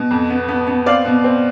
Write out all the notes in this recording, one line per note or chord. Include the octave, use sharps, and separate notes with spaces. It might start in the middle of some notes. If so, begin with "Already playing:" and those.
Already playing: B2
F2
B3
B3
B3
C4 D5 F5
B2
C4